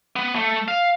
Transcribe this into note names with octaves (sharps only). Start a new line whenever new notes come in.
B3
A3
F5